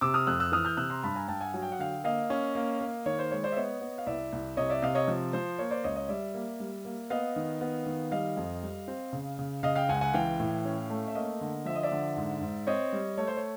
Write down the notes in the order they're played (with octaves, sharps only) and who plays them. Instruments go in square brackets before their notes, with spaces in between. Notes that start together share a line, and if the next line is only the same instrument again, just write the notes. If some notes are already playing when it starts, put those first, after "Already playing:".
[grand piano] C3 D6 E6
D#6 F6
F2 E6 F#6
E6 F#6
E3 D#6 F6
F6 G6
C3 E6 F#6
A#5 C6
G2 A5 B5
G#5 A#5
G2 G5 A5
F#5 G#5
F#3 G#5
G5
F#5
D3 F5 G5
A#3 D#5 F5
C#4
A#3
A#3
D#3 C#5
C5
G#3 C#5
C5 D5
E5
B3 C#5 D#5
B3
F5
C2 D5 E5
C2
C3 C#5 D#5
D5 E5
C3 D#5 F5
C#5 D#5
F3
F3 C5
A#3 C#5
C5 D5
C#2 C#5 D#5
C#5 D#5
G3 D5 E5
A#3
G3
A#3
B3 D#5 F5
D#3
B3
D#3
G3 D#5 F5
F2
G3
C4
C#3
C#3
C#3 D#5 F5
F5 G5
C#2 F#5 G#5
F#5 G#5
E3 F5 G5
A2
C#4
A3
E5
A#3 D#5 F5
D3
F3 E5
D#5
D5 E5
D3
G#2
G#2
C4 C#5 D#5
G3
A3 C#5
C5
C#5